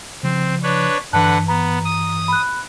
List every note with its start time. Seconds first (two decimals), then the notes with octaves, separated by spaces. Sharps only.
0.23 C#3 F3 C4
0.63 D4 B4 C#5
1.13 G2 D3 E3 B4 F#5 A5 F#6
1.48 B3 A#5
1.85 D#6
2.28 B5 F#6